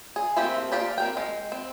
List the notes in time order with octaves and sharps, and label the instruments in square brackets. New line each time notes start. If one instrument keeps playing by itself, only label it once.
[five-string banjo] G#4
F3 A3 A#3 C4 G4
A#3 F4 G4 D5
C4 A#4 G5
G#3
C4